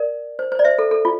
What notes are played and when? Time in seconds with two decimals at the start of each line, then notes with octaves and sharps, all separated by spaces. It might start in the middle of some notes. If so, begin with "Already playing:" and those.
Already playing: A#4 D5
0.39 C5
0.52 C5
0.59 D5
0.65 C5 E5
0.79 A4
0.91 A4
1.05 F4